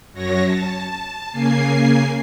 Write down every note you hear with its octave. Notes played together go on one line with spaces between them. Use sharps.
F#2 F#3 C#5 A#6
A5
C#3 A#3 G#5 C7